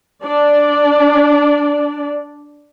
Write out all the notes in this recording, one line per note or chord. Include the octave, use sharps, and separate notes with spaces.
D4 D5